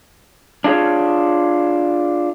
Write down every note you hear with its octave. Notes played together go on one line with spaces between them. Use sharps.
D4 E4 F4 G#4 C#5